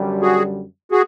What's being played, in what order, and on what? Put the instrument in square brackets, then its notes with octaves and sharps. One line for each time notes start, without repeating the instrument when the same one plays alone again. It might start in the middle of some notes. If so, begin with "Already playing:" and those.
Already playing: [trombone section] F#2 D3 G3
[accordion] F#4 G#4
F#4 G#4